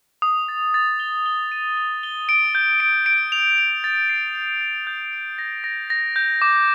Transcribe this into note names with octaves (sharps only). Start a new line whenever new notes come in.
D#6
A6
A6
G7
G7
D#7
G7
G7
D7
G6
D7
D7
F7
F7
A6
C7
A6
A6
G6
D7
A#6
A#6
A#6
G6
D6